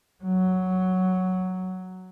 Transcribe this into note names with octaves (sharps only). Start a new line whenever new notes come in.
F#3